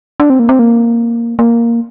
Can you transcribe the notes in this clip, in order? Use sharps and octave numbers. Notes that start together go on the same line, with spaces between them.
D4
C4
A#3
C4
A#3
A#3